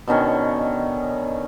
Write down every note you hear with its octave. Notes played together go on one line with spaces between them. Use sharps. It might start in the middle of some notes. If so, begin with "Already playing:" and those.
B2 D3 D#3 C#4